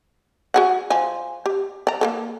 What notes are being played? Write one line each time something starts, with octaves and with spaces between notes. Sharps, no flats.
F#4 G#4 F#5
F3 G#5
G4
D5 A#5
A#3 G4 A4